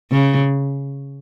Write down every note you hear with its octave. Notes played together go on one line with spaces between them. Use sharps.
C#3